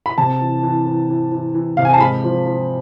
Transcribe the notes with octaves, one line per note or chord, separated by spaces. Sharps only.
B5
C3 A5
E3
E3
E3
E3
E3
E3
C3 F5
G#5
A5
G#3 B5
F3
F3